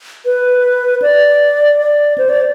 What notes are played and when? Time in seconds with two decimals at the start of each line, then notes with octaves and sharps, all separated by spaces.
0.26 B4
1.02 D5
1.79 D5
2.18 C5
2.29 D5